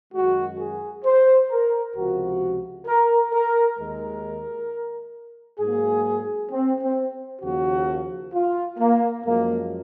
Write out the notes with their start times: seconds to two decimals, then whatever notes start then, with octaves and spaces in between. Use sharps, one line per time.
0.13 F#2 D#3 G#3 F#4
0.59 G#4
1.05 C5
1.50 A#4
1.95 C#2 C3 F3 F#4
2.86 A#4
3.32 A#4
3.78 D#2 D#3 G#3 A#4
5.59 G#2 F#3 A#3 G#4
6.50 C4
6.81 C4
7.42 D#2 C#3 F3 A#3 F#4
8.33 F4
8.78 A#3
9.24 F#2 F3 G#3 A#3